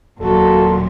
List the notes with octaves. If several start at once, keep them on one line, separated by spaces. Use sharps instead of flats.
D#1 A#2 F#3 F#4 A4